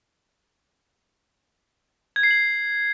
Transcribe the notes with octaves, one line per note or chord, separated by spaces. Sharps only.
G#6
C7
F#7